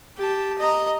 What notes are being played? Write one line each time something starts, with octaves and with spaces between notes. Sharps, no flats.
G4 A5
D#5 A#5